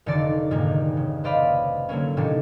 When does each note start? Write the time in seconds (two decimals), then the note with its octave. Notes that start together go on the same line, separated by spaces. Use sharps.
0.06 F1 D3 D#3 D5 A6
0.51 F2 G#2 C3 F3 G#3 A#3
0.97 C#3
1.24 B4 C5 D5 D#5 F5 B5
1.89 D3 F#3 A#3 C#4
2.17 A2 C3 D#3 C#4 D4